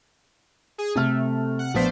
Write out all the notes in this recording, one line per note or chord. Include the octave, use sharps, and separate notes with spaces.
G#4
C3 A3 F6
F#5
A#1 A3 B3 C5 D5 B6